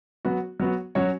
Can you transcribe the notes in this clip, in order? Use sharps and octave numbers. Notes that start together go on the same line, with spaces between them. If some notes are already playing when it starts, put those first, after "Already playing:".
F#3 B3 F#4
F#3 B3 F#4
F#3 C#4 F#4 C#5